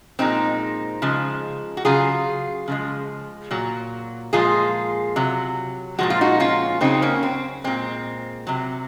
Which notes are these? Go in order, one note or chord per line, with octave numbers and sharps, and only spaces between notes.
A#2 F3 G#3 C4 D#4
C#3 F3 G#3
F#4
C#3 F#3 F4 G#4
C#3 F3 G#3
A#2 F#3
A#2 F3 G#3 F4 G#4
C3 F#3
A#2 F3 G#3 F#4
F4
D#4 F#4
C#4 F4
C#3 F#3 C4 D#4
A#3 C#4
C4
A#2 G#3 C4
C3 F#3